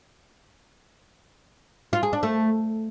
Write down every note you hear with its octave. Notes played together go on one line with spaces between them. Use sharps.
F4
G#4
D4
A3